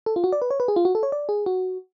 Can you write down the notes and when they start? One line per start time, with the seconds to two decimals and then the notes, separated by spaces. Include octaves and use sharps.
0.06 A4
0.16 F4
0.24 F#4
0.32 D5
0.42 B4
0.51 C#5
0.60 B4
0.68 G#4
0.76 F4
0.85 F#4
0.95 A4
1.03 C#5
1.12 D5
1.29 G#4
1.46 F#4